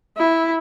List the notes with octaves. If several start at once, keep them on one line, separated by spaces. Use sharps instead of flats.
E4